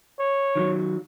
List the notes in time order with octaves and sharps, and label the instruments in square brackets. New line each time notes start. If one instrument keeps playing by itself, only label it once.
[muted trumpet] C#5
[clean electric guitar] D#3 F3 F#3